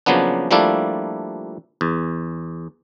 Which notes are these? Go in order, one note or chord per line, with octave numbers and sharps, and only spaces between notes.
C#3 F3 F#3 A#3 B3 D4
F3 G3 A3 A#3 D4 E4
E2